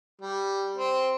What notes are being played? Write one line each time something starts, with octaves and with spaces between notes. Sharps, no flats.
G3
C4